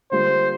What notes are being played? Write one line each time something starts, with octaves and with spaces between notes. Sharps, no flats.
D3 G3 A#3 F4 C5